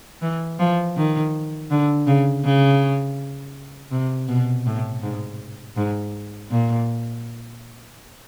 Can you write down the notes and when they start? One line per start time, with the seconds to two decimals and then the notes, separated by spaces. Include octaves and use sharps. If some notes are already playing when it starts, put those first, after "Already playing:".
0.22 E3
0.59 F3
0.97 D#3
1.71 D3
2.07 C#3
2.45 C#3
3.91 C3
4.28 B2
4.66 A2
5.03 G#2
5.77 G#2
6.51 A#2